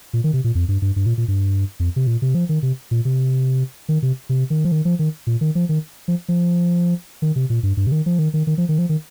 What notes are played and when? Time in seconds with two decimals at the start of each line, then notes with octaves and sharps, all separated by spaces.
0.13 A#2
0.24 D#3
0.33 C3
0.44 A#2
0.55 F2
0.68 G2
0.82 G2
0.96 G2
1.06 A#2
1.18 A#2
1.28 G2
1.80 F2
1.96 C3
2.07 A#2
2.22 C3
2.35 F3
2.49 D#3
2.63 C3
2.91 A#2
3.05 C3
3.89 D#3
4.02 C3
4.29 C3
4.50 D#3
4.65 F3
4.72 D#3
4.85 F3
4.99 D#3
5.27 A#2
5.41 D#3
5.55 F3
5.69 D#3
6.08 F3
6.28 F3
7.22 D#3
7.36 C3
7.50 A#2
7.63 G2
7.77 G2
7.86 C3
7.92 D#3
8.06 F3
8.19 D#3
8.34 D#3
8.47 D#3
8.58 F3
8.69 D#3
8.78 F3
8.89 D#3